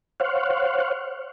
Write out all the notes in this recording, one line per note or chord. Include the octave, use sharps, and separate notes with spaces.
C5 C#5 F5 F#5